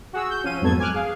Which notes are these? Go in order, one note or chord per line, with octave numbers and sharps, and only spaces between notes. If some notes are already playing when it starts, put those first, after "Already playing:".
F#4 G#4 E6
G6
F3 C#4 F5 D#7
F2 G#2 F#3 B3 A4 G#6
G#5 D6 F6 F#6
G#4 F5